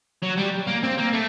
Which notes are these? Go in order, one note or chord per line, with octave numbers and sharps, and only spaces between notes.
F#3
G3
A#3
C4
A#3
A3